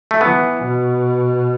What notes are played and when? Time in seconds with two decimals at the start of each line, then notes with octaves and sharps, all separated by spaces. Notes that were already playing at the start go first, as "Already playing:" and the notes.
0.11 A3
0.21 E3 B3
0.63 B2